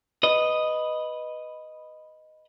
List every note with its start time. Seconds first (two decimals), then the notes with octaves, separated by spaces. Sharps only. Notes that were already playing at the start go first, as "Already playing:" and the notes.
0.23 B4 D#5